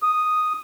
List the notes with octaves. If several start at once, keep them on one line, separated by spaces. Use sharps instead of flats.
D#6